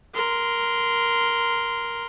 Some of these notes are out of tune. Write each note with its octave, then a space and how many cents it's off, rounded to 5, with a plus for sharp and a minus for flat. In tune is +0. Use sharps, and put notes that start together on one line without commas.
A#4 +5 C6 -15